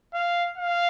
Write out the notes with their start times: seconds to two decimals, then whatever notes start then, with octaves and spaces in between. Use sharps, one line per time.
0.14 F5
0.58 F5